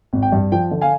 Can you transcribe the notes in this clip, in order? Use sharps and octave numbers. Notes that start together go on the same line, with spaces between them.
G#1
G5
G2
F3 G5
D3
F5 G#5